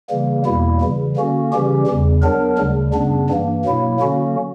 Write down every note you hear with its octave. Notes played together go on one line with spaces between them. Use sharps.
C#3 E3 G3 A#3
E2 B2 G3 A#3 E4
C#3 E3 G3
D3 A#3 C#4 F#4
C#3 E3 G3 C#4 G4
E2 C#3 G3
F#3 B3 D4 A#4
D2 C#3 G3
F#2 C#3 G3 B3 D4
G2 E3 A#3
B2 F#3 A#3 E4
D3 F#3 A#3 C#4 F#4